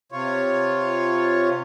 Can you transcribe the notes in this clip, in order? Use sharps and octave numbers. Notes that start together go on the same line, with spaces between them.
C3 F4 C#5